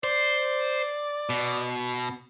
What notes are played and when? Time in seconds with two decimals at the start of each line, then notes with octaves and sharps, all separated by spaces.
0.04 C5 D5
1.30 B2